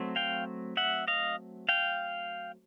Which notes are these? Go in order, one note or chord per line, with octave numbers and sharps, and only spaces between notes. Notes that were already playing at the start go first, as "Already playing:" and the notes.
Already playing: F#3 A3 C4
F5 G5
E5 F#5
D#5 F5
F5 G5